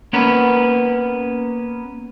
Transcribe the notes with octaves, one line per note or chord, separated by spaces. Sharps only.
A#3 B3 C#4 B4